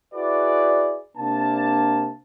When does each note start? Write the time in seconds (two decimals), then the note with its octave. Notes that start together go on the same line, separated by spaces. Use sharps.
0.14 E4 F#4 G#4 B4 D5
1.18 C3 A#3 D4 A5